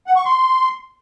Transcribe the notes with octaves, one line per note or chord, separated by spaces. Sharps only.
F#5
C#6
C6